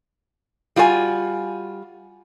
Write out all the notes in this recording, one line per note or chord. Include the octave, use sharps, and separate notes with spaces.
G3 F4 F#4 C5 G#5